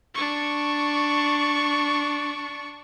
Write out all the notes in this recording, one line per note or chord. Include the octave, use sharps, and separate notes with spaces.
D4 C#6